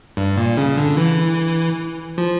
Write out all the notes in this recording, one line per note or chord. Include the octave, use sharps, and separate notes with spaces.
G2
A#2
C#3
D3
E3
F3